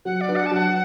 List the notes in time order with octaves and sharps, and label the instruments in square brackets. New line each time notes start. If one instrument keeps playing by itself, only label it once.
[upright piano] F#3 [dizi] F#5
[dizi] D5
[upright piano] D4 F#4 B4
[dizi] F#5
A5
[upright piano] F#3 [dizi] F#5